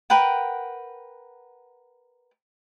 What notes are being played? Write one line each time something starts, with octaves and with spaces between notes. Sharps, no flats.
A#4 B4 F#5 G5